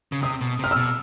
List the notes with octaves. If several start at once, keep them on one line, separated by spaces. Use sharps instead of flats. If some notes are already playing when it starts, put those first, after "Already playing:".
C#3
C3 D#6
B2
C3 F6
E6
B2